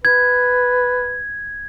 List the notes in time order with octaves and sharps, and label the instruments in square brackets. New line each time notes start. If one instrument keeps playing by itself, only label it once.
[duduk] B4 [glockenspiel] G#6